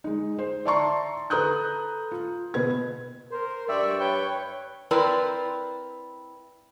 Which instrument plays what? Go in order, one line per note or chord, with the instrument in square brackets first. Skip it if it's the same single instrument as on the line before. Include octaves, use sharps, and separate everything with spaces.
[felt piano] G#3 D#4
C5
D5 E5 A5 A#5 C6 C#6
A4 B4 A#5 D#6 F#6 G6
F4
B2 B4 G#6
[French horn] A#4 [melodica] C5
[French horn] G2 [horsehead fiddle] D5 [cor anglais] E5 [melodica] G5 C#6
[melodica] B4 [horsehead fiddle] C#5 [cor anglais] G5
[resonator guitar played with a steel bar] C4 E4 A#4 B4 D5